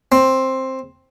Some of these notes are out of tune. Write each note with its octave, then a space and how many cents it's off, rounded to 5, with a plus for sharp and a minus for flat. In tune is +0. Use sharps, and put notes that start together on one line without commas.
C4 +10